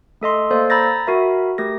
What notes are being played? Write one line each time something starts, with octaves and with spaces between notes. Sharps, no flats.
A3 A4 D#5 C6
A#3 A4 C5 D5 F5
A#5 B5 E6 G6 A6 A#6
A#6
F#4 A#4 E5 B5
A3 G4 A#4 A#6